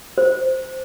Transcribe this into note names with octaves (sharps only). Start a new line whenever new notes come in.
C5